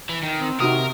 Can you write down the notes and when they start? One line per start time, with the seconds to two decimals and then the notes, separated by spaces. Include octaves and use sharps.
0.09 E3
0.23 D#3
0.40 C4
0.60 C3 D#4 F#4 A#4 D#6